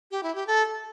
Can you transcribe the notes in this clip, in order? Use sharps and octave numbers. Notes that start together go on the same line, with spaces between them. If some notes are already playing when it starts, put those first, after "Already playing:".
G4
E4
G4
A4